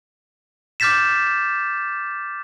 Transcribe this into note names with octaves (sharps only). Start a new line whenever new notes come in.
D6 F6 G6 A6 B6 E7